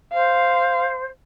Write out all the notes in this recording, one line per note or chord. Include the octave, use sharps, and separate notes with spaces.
C5 F5